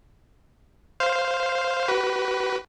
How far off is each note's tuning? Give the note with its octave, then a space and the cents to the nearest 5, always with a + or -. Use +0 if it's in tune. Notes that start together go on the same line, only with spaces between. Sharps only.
C5 +0 F5 +0
F#4 +45 B4 +0